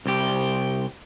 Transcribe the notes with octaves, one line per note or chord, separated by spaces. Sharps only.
C2 G4